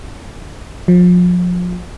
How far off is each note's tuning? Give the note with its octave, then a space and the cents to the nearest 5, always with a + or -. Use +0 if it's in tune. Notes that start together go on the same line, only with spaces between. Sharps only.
F3 +35